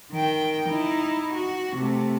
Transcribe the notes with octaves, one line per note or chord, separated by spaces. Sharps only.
D#3 G5
D#4 E4
F#4
C3 A3